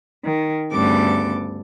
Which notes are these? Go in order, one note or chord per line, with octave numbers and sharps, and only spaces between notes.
D#3
D2 G2 C#3 B3 A4 D6